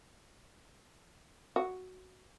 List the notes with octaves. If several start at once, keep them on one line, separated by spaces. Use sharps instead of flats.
F#4